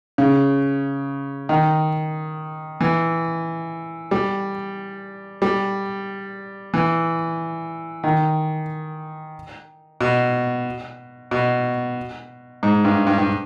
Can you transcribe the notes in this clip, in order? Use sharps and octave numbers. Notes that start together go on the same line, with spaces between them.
C#3
D#3
E3
G3
G3
E3
D#3
B2
B2
G#2
G2
G2
G2